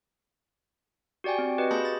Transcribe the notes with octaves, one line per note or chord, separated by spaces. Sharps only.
F#4 G4 D5 G5 G#5
C4
F#4 G4 B4 D#5
A#3 G#4 A5 B5 G6 A#6
A6